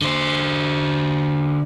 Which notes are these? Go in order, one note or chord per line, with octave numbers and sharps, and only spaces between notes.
D3 C5